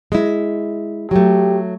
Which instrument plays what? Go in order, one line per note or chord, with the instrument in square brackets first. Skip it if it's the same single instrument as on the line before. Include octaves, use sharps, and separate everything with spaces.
[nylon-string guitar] G#3 E4
[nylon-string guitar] F#3 A3 [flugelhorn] G4